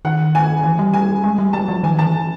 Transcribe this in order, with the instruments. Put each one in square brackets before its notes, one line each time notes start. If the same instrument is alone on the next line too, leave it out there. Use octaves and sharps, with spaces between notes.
[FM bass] D#3 [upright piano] F#5
[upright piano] G#5
[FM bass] E3
G3
[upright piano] G#5
[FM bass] G#3
G3
[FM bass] F#3 [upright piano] A5
[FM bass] F3
[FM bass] D#3 [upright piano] G#5
[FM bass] E3 [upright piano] A5